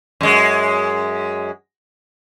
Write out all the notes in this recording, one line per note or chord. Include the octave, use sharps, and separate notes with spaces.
F#2 G#3